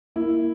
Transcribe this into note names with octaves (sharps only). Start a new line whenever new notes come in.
A#3 E4